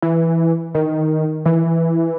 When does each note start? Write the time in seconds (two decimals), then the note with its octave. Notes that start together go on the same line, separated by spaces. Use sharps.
0.02 E3
0.75 D#3
1.46 E3